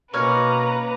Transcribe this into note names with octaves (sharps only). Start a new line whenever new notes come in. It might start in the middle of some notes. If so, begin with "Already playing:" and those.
B2 A#3 C#4 D#4 B4 C#5 A#5 F6